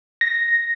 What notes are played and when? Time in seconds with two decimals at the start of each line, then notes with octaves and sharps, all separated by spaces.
0.21 A#6